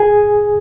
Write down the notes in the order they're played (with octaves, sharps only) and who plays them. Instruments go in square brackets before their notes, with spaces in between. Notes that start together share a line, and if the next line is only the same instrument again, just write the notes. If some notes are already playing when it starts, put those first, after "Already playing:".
Already playing: [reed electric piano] G#4 G#5